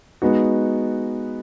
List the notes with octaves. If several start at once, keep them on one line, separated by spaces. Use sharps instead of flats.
G#3 B3 D#4 F#4